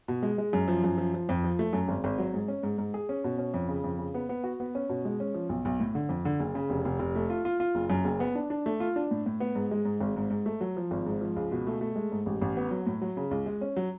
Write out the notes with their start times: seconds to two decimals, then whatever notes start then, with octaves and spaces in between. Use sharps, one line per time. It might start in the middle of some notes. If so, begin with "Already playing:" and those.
0.08 B2
0.23 G#3
0.38 G#3
0.53 F#2
0.68 F3
0.84 F#2
0.98 F3
1.14 F3
1.29 F2
1.44 F3
1.59 A3
1.73 F#2
1.88 G#1
2.04 G#1
2.18 F#3
2.34 G#2
2.48 C#4
2.63 G#2
2.78 G#2
2.94 G#4
3.09 C#4
3.24 B2
3.38 C#4
3.54 F2
3.69 C#3
3.84 F2
3.99 C#3
4.14 B3
4.29 B3
4.44 F#4
4.60 B3
4.75 C#4
4.89 B2
5.05 G#3
5.20 C#4
5.34 F3
5.49 B1
5.65 B1
5.80 A2
5.95 D3
6.09 F2
6.25 D3
6.40 F#1
6.55 C#3
6.70 F1
6.85 F1
6.99 F1
7.16 A3
7.30 F4
7.45 F4
7.60 F4
7.75 F#1
7.90 F#2
8.05 F#1
8.20 B3
8.35 D4
8.50 D4
8.66 A3
8.80 F4
8.96 D4
9.11 A2
9.26 A2
9.40 B3
9.55 G#2
9.71 G#3
9.85 G#2
10.01 G#1
10.16 G#2
10.30 G#2
10.46 A3
10.61 F#3
10.77 F3
10.91 G#1
11.06 G#2
11.21 F3
11.36 C#2
11.52 B2
11.67 A3
11.81 A3
11.96 G#3
12.12 G#2
12.26 A1
12.41 A1
12.57 B3
12.71 F#3
12.86 A2
13.02 F#3
13.17 C#3
13.31 C#2
13.46 G#3
13.61 C#4
13.76 F#3